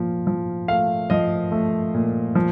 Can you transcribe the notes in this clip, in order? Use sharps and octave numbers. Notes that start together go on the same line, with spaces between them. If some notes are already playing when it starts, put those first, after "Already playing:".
Already playing: A#2 F3
F3
A3 F5
F3 D#5
A3
A#2
F3